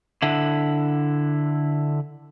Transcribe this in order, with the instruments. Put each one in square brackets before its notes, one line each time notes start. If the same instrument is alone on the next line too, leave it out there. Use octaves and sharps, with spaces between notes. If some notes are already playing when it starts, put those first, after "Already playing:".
[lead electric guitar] D3 E4